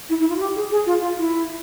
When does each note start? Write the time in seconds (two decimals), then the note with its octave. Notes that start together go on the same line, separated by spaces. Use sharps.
0.09 E4
0.20 E4
0.30 F4
0.36 F#4
0.40 G4
0.56 G#4
0.71 G#4
0.86 F4
1.02 F4
1.18 E4